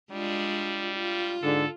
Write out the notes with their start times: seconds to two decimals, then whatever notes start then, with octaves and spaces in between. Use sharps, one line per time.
0.11 G3 G#3 D4 F4
0.95 F4
1.43 G#2 D3 A4